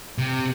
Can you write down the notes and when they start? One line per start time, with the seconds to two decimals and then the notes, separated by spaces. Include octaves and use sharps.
0.18 C3